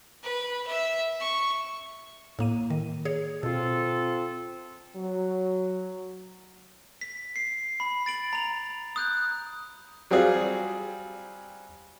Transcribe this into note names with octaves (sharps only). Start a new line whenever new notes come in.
B4
E5
C#6
A2 A#3 D#7
D#3
G#4 C#5
B2 C4 F4 A4
F#3
B6
C7
B5
A6 D7 F#7
A#5 F7
D#6 F#6 G6
F#3 G3 C4 F4 G#4